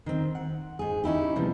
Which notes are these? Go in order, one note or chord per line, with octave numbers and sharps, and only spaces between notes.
D#3 C4
F#5
G#2 G#4
C#4 D#4 E4 G4
C3 F3 G3 B3